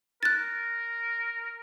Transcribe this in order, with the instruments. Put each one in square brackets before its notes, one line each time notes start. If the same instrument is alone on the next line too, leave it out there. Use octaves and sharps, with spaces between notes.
[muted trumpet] A#4 [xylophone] F#6 A6